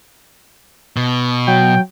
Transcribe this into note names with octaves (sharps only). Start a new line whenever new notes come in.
B2
F#3 G5